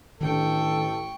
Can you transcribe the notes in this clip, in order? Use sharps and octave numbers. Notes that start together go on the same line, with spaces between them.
A1 D#3 D4 A4 G5 C#6